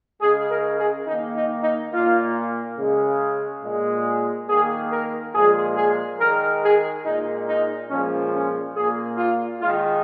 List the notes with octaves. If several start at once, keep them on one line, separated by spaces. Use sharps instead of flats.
C#3 G#3 G#4
A#4
G#4
D#3 A#3 D#4
D#4
D#4
A#2 A#3 F4
C#3 G#3
A#2 G#3
D#3 A#3 G#4
A#4
A#2 F3 G#3 G#4
G#4
D#3 G#3 A#4
G#4
A#2 G#3 D#4
D#4
A#2 F3 G#3 C#4
C#4
A#2 A#3 G#4
F4
D#3 G#3 F4